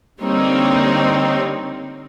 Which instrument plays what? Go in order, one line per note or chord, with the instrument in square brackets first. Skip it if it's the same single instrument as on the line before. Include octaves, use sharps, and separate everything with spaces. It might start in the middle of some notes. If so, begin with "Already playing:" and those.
[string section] D3 G3 A#3 C4 D#4 C#5